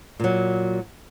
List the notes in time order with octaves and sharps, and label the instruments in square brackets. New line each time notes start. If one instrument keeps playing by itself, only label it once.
[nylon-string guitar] A#2 F#3